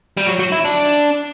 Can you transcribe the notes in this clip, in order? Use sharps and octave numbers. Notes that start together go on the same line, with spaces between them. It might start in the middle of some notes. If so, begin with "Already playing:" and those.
G3
F#3
F#3
E4
D4